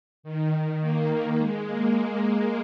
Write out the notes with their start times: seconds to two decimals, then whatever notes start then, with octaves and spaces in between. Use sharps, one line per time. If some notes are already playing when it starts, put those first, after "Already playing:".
0.23 D#3
0.52 D#3
0.80 A#3
1.38 G#3
1.67 A#3
1.96 G#3